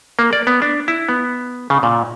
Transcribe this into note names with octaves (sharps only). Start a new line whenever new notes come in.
A#3
D5
B3
D4
E4
B3
C#3
A#2